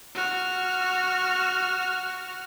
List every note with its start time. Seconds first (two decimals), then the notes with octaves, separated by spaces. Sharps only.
0.15 F#4 F6